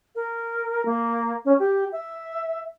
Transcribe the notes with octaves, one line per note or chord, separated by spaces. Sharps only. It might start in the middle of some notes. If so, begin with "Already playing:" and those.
A#4
A#3
C#4
G4
E5